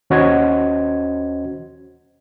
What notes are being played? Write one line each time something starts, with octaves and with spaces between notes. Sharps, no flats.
D#2 C#4 F#4 C5 D#5 G#6